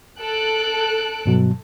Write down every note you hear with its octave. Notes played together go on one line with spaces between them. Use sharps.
A4 F#6 D7
G2 B2 F#3